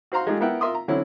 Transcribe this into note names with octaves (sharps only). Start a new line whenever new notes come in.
F#4 C5 F5 A#5 C6
G#3 A3 D#4 F4 G4 G#4
B3 E4 A#4 E5 F#5 G5
F4 A#4 E5 C6 D#6
A#5
D3 F#3 C4 C#4 E4 C#5